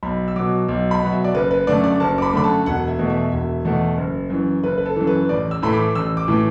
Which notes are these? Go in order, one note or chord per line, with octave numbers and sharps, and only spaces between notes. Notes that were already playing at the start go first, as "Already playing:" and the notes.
B1 B5
E6
B2 F#3 D6
B1
B5
B2 F#3 F#5
E5
D5
F#1 B4
B4
F#2 D3 A3 D5
D5
F#1 A5
D6
B5
D6
F#2 D3 A3 B5
A5
E1 F#5
E5
E2 B2 A3
E5
E1 E5
E2 B2 A3
F#1
F#2 E3
F#1 B4
B4
A4
F#2 E3
B4
A1 D5
E6
A2 E3 A3 B5
D6
A1 E6
D6
A2 E3 A3